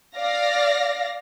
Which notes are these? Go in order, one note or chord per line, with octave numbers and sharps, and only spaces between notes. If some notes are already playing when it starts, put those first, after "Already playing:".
D5 F5 A#6